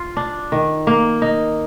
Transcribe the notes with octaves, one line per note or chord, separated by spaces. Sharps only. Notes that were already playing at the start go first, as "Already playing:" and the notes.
Already playing: F4
D4
D#3
A#3
D#4